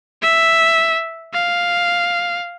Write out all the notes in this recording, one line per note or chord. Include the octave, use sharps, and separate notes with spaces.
E5
F5